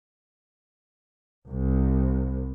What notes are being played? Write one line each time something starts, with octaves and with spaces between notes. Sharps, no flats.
C2